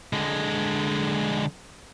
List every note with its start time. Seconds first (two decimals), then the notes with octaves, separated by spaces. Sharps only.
0.13 D3 G#3